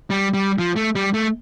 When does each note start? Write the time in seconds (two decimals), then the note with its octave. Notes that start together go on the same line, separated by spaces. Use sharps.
0.10 G3
0.34 G3
0.59 F3
0.76 A3
0.95 G3
1.14 A3